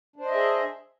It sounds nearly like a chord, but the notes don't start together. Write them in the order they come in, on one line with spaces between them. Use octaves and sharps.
D4 C5 D#5 E5 G#4